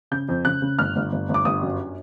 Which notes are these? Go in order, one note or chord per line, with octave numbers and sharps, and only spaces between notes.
C#3 G6
F2
C#3 F#6
C#3
G1 F6
G1
G1
G1
D6
G1 D#6
F#2